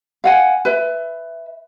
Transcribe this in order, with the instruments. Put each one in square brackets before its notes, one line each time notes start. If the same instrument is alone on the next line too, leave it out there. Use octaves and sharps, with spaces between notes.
[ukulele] F5 F#5 G#5
B4 E5